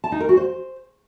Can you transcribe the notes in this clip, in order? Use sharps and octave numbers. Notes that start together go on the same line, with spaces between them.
A5
D#4
A#4
F#4
C5